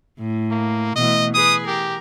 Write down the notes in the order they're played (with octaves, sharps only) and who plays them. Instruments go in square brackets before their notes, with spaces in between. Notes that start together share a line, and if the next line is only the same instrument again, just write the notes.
[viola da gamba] A2
[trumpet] A#3
[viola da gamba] B2 E3 A3 [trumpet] D#5
[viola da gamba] G#4 B4 [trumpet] D#6
[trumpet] G4 [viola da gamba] A#4